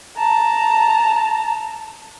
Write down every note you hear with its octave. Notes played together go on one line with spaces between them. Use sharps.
A5 A#5